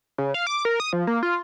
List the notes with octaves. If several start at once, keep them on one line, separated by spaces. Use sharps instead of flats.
C#3
F5
D6
A#4
D#6
F3
A#3
F4